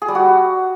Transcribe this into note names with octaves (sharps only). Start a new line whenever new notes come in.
G#4
G3
F#4